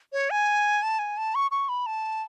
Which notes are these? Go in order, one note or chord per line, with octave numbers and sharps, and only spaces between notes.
C#5
G#5
A5
G#5
A5
C#6
C#6
B5
A5